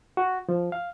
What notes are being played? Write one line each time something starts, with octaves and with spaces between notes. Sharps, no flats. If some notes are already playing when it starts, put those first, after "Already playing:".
F#4
F3
F5